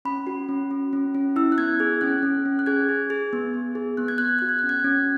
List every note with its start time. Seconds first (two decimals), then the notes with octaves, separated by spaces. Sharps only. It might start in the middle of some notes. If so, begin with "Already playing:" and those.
0.05 C#4 B5
0.27 F#4
0.49 C#4
0.71 C#4
0.93 C#4
1.15 C#4
1.36 E4 E6
1.52 F#6
1.58 B3 G#6
1.79 G#4 G#6
2.01 C#4 F#6
2.23 C#4
2.45 C#4
2.59 F#6
2.66 G#4 G#6
2.89 G#4
3.10 G#4
3.33 B3
3.54 B3
3.75 G#4
3.97 B3 F#6
4.08 G#6
4.18 B3 F#6
4.28 G#6
4.39 F#4 F#6
4.49 G#6
4.59 C#4 F#6
4.69 G#6
4.80 C#4 F#6